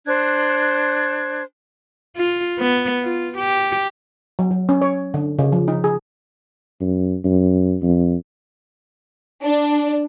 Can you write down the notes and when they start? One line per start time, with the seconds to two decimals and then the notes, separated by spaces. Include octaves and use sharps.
0.06 D4 C5 F#6 G#6
2.17 F4
2.59 B3
3.03 F4
3.38 G4
4.39 F#3
4.51 F#3
4.69 C#4
4.82 C#5
5.14 D3
5.39 C#3
5.52 F3
5.68 D#4
5.84 G#4
6.81 F#2
7.24 F#2
7.82 F2
9.42 D4